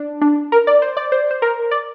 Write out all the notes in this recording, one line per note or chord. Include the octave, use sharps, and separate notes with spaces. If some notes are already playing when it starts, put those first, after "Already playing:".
Already playing: D4
D4
A#4
D5
C5
D5
C5
C5
A#4
D5